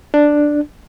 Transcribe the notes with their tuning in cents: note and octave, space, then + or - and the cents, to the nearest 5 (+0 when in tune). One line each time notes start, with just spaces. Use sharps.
D4 +5